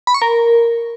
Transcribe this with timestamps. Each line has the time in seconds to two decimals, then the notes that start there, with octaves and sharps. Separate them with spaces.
0.07 B5
0.14 C#6
0.22 A#4